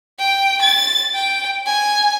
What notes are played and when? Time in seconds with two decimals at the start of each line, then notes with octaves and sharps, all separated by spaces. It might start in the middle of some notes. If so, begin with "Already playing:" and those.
0.19 G5
0.62 A6
1.14 G5
1.66 G#5